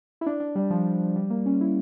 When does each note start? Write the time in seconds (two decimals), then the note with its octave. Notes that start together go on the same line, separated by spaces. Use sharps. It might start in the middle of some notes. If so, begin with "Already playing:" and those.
0.21 E4
0.26 D4
0.40 D4
0.55 G3
0.70 F3
1.16 G3
1.30 A#3
1.46 C#4
1.61 E4